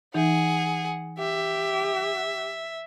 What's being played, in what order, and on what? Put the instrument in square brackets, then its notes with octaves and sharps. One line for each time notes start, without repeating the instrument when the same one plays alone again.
[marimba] E3 D#4 [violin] G#4 F#5
[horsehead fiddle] G4 [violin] E5